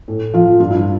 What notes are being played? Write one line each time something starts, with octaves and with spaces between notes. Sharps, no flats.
A2
F3 F4
G2 F4
E4